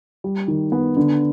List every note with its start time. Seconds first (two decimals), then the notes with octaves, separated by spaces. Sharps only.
0.24 G3
0.48 D#3
0.72 B3
0.97 D3